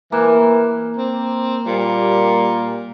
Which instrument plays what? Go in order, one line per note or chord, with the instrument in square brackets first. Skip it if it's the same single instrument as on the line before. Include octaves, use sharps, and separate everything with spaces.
[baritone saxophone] E3 [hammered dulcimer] A#3
[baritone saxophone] C4
[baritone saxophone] A#2 [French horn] G3